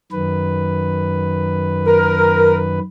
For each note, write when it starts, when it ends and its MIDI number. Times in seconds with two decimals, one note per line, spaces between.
0.12 2.79 42
0.12 2.79 51
0.12 2.79 71
1.87 2.57 70